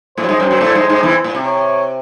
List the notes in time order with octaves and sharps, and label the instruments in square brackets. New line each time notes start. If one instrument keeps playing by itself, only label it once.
[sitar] A2 A3 [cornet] C5
[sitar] F#3
G#2 G#3
F#2 F#3
F#2 F#3
A2 A3
G#2 G#3
G#2 G#3
E2 E3
A2
C3
[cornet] C#5